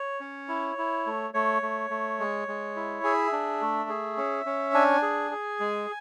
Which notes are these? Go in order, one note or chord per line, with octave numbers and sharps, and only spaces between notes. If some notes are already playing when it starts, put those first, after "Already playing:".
Already playing: C#5
C#4
E4
E4
A3
A3 C#5
A3
A3
G#3
G#3
E4
G#4 E5
D4
A3
G#4
C#4
C#4
D4 G#5
G#4
G#4
G#3